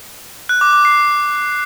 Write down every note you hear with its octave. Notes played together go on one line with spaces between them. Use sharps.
F#6
D6
D6
C7